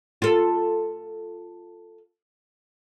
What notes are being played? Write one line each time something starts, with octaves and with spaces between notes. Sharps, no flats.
F4 A4